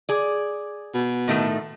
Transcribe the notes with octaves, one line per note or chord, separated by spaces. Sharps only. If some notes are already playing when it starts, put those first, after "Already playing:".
G#4 D5
B2
A2 D#3 A3